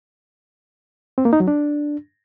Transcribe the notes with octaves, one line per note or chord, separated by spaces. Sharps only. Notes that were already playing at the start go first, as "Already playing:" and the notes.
C4
A#3
D#4
F#3
D4